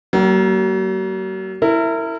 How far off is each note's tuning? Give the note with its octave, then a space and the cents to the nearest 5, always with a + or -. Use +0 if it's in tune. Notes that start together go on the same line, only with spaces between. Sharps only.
F#3 +45 A#3 +0
E4 +0 A#4 -30